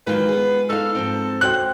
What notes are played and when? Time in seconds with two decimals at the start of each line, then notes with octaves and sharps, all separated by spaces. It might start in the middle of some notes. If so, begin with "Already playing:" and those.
0.07 D#3 E3 F#3 G#3 F4 B4
0.29 B3 G#4
0.70 D#4 A4 F5
0.95 G#2 F3 C4
1.41 F#4 C5 G5 F#6